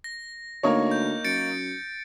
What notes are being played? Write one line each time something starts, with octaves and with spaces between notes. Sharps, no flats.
A#6
D2 A#3 D#4 C#5
G6
F#2 A6 C#7 D7